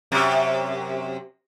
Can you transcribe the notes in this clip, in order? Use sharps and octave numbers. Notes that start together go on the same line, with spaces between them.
F#2 C3